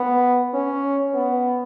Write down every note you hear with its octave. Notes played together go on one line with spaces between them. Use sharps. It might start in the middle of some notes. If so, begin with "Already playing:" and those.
Already playing: B3
C#4
B3